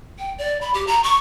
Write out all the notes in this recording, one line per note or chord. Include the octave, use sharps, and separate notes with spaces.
G5
D5
B5
G4
A#5
C#6